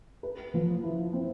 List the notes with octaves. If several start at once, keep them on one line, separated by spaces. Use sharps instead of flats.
B4
F3
E4
C4